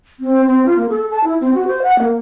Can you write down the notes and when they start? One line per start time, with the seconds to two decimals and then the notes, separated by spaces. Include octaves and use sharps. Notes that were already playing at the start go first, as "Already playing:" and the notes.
0.20 C4
0.46 C4
0.66 F4
0.77 A#3
0.89 A4
1.11 A5
1.24 E4
1.41 C4
1.54 F#4
1.67 C5
1.82 F#5
1.99 A#3